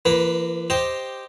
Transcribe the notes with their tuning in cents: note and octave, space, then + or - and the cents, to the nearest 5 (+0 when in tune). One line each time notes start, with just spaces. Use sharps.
E3 +45 A#3 +0 B4 +0
G4 +0 C5 +0 D#5 +0